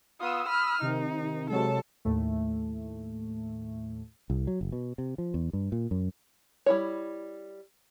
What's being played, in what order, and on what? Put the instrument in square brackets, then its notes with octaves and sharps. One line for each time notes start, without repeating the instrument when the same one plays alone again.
[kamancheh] B3 F4 [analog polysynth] D#6 E6
[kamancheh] B5 F6
[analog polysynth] C3 D#3 [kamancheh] D#4
[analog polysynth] C3 F#3 G#3 [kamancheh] A4 A5
[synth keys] D#2 A2 A3
[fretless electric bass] C2
F#3
F#1
B2
C3
F3
E2
G2
A#2
F#2
[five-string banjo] G3 E4 C#5